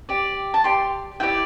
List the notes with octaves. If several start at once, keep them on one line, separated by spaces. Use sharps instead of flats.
G4 D5
A5
G4 D5 C6
E4 G4 D5 G5